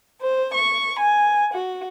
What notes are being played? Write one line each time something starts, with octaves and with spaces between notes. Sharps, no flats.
C5
C#6
G#5
F#4